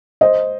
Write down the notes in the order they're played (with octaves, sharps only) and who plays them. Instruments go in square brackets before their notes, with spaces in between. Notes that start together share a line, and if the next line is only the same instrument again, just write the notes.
[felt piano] C5 D#5